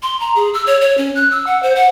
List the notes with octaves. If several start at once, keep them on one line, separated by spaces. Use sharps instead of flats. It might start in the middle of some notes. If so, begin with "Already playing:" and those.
C6
A#5
G#4
E6
C#5
C#5
C#4
F#6
E6
F#5
C5
F#5